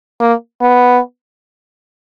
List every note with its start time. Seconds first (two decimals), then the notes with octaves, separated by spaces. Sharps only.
0.21 A#3
0.62 B3